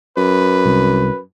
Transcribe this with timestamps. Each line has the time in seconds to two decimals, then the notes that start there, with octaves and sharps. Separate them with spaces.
0.17 F#2 B4
0.65 C2